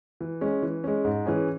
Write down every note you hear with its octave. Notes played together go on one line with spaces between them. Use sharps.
E3
G#3 C#4
E3
G#3 C#4
G#2
E3 C#4 G#4